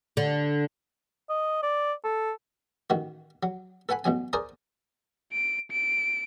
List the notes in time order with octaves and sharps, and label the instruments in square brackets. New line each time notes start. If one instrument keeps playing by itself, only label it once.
[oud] D3
[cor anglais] D#5
D5
A4
[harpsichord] A1 D#3 F#4
F#3
A4 B4 F#5 G#5 B5
A1 B2 F#3 G#5
G#4 A#4 C5 D5 G#5 A#5
[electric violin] D7
D7